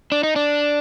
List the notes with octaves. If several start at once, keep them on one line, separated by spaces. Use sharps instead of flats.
D4
D#4
D4